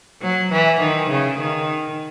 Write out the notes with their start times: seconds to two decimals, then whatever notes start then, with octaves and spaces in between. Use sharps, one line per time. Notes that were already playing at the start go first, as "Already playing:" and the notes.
0.22 F#3
0.51 E3
0.81 D#3
1.10 C#3
1.39 D#3